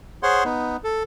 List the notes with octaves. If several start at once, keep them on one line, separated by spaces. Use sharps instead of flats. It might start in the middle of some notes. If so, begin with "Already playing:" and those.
G#4 C5 C#5 F#5 C6
B3 D#4
A4